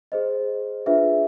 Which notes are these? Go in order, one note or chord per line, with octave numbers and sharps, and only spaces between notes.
G#4 C5 D#5
D4 F4 G#4 B4 E5